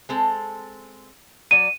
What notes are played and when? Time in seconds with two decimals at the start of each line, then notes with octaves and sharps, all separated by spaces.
0.09 G#3 C4 A4
1.51 F#3 D5 D#7